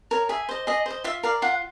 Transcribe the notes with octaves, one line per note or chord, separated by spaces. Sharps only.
A#4 C#5
G#4 E5
C5 D#5
G#4 D#5
C5 D#5
F4 E5
A#4 D5 F5
F4 F#5